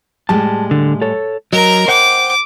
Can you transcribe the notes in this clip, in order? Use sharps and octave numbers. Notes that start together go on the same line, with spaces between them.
A2 G3 G#3 A5
D3
A4 C#5
F#3 A#4 D#5 A#5
C5 F#5 G5 D6